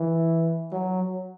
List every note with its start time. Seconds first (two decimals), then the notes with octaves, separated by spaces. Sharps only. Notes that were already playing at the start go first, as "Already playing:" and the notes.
Already playing: E3
0.72 F#3